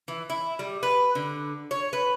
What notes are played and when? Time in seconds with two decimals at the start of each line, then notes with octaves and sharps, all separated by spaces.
0.08 E3
0.30 E4
0.59 G3
0.83 B4
1.15 D3
1.71 C#5
1.93 B4